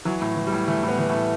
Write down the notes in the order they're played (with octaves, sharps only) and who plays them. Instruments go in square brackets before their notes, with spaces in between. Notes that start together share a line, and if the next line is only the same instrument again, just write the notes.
[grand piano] E3 F#3
A2
E3
G3
A2
E3 A3
A2
B3
E3
A3
A2